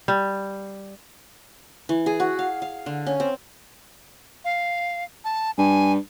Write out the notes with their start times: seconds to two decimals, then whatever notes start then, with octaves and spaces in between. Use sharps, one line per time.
0.08 G3
1.89 E3
2.06 G#4
2.20 F#4
2.39 F5
2.62 F5
2.86 D3
3.06 C#4
3.20 C4
4.45 F5
5.24 A5
5.58 G2 G#5